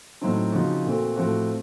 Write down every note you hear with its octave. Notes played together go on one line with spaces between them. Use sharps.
A2 F#3 C4 D#4
C#3 F3 C4 D#4 F#4
A#2 A3 C4 F#4
A2 F3 A3 C4 F#4